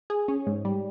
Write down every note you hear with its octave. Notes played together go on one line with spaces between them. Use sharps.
G#4
C#4
G#2
G3